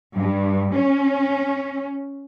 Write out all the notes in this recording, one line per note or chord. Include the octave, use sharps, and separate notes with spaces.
G2
C#4